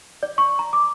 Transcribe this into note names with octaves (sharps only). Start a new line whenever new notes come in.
D5
C#6
A#5
D6